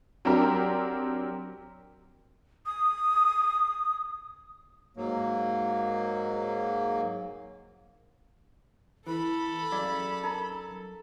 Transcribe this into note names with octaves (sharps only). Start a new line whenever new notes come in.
F#3 C4 D4 G4 A#4 A#5
D#6
G#2 F#3 A#3
E3 A4 B5
F#2 G#4 D5 F5
D#4 A#4 A#5